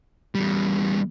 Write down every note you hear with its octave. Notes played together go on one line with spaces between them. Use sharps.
E2 G3